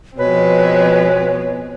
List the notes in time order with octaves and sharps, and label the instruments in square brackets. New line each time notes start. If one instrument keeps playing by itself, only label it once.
[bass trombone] B2 [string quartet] F3 G#3 C4 [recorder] B4 [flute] C#5